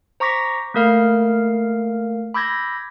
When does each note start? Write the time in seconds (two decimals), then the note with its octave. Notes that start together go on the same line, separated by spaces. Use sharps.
0.20 C5 A#5 C#6 D6 A#6 B6
0.74 A3 A#3 A#4 F5 F6
2.34 B5 D6 E6 G6 G#6 A#6